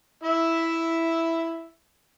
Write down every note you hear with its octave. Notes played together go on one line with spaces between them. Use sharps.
E4 E5